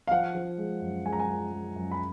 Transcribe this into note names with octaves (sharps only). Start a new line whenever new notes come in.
F5
F3 F#5
F3
G#3
F#2
G#3 G#5
A#5
G#5
F3
G#3
F#2
B5